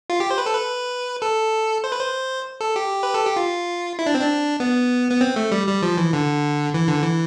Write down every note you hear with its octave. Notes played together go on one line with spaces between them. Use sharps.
F4
G4
C5
B4
A4
B4
A4
C5
B4
C5
A4
G4
B4
A4
G4
F4
E4
D4
C4
D4
B3
B3
C4
A3
G3
G3
F3
E3
D3
E3
D3
E3